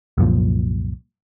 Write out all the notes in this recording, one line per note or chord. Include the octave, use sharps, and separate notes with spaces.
C2 F#2 A#2 F3